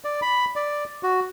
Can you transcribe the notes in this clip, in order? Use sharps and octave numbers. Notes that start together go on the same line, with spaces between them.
D5
B5
D5
F#4